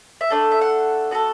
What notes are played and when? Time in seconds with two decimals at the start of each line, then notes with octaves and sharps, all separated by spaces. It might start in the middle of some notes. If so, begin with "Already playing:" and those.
0.21 E5
0.30 A3 D4 A4 D5
0.52 E5
0.61 F#5
1.11 B3 F#4 A4